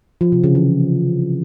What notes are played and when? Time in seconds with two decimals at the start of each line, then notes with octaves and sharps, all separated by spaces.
0.21 F3
0.32 C3
0.44 C#3
0.55 E3